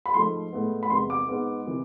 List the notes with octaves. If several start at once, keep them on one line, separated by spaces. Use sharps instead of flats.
B5
G#2 F3 A3 C6
A2 G#3 B3
B5
E2 C3 G#3 B3 C6
D6
G#2 G#3 B3
C3 E3